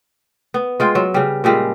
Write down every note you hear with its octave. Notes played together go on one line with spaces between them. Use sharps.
B3
G#3 F4 G5
F#3
C#3 G3
A#2 C#3 G3 G#3